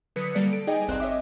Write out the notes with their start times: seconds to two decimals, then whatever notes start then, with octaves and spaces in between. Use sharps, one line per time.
0.16 D3 F#3 B4 D#6 B6 C#7
0.35 G3 A#3 A4 D5
0.53 A4 D7
0.67 D#4 G#4 D5 D#5 G5 G#5
0.88 G1 C2 C4 F#6
1.00 C#5 D#5 E5 D6